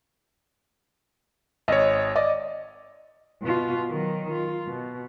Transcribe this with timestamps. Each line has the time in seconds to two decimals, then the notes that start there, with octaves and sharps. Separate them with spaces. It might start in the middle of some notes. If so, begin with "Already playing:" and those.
1.68 G#1 C#5 D#5
2.15 D5 D#5
3.43 B2 F4
3.91 D#3 F#3
4.32 F4
4.68 B2